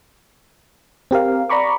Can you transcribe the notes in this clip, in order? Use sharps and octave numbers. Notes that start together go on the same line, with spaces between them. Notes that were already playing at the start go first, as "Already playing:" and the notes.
C4 G4 A#4 F5
D5 A#5 B5 C#6 D6